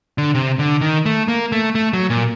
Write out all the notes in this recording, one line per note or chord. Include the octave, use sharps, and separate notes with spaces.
D3
C3
D3
D#3
A3
A#3
A3
A3
F#3
A#2